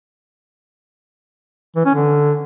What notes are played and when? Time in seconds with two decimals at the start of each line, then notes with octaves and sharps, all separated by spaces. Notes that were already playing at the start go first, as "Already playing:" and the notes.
1.76 E3
1.85 C#4
1.95 D3